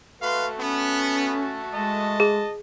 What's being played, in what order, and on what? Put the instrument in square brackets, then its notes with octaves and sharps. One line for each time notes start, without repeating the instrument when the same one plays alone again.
[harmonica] A3 F#4 A4 [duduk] B4 [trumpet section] F5 C6
[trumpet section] B3 [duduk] C#4
[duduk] G#3 [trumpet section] D#5 A5
[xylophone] G#4